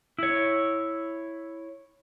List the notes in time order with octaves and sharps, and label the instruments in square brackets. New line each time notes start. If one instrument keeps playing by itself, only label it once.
[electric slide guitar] E4 C#5